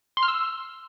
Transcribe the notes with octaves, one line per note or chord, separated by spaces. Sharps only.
C6
F6
E6